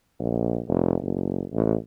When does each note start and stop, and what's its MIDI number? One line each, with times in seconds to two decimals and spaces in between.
0.19 0.59 34
0.68 0.95 29
1.03 1.44 30
1.53 1.75 33